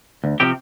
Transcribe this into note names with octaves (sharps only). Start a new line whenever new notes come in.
D2
C3 F3 C4 G4